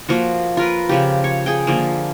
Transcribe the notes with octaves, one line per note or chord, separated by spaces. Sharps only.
F3 A#3 F#4
F4 A#4 B4
C#3 F3 G4
C#5
G#4 G5
D3 F3 A#3